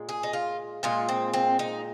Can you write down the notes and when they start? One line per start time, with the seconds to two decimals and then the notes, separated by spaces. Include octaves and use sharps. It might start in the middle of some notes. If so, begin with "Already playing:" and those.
Already playing: A#2 G#3
0.09 G#4
0.23 D#4
0.33 F4
0.83 A#2 G#3 F4
1.09 C4
1.33 C4
1.59 D#4